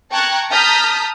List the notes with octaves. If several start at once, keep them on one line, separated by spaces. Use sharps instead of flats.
G5 A5 A#5 C#6 F#6 G#6
A5 A#5 D#6 F6 G6 B6